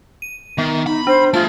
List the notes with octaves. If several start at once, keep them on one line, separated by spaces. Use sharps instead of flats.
D#7
D#3 B3
D#4 B5
D4 C5
A3 F4 G#4 A5